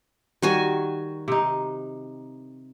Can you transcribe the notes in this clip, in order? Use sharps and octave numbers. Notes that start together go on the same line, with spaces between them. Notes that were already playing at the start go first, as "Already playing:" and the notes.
D#3 G3 F#4 G#5
C3 D#4